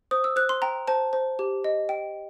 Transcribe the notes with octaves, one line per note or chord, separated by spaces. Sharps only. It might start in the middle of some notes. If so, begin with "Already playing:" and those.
C5 D#6
E6
C5 F#6
C6
G5 A#5
C5 A5
C5
G4
D#5
G5